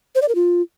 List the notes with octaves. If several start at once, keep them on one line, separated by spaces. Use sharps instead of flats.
C5
D5
A#4
F4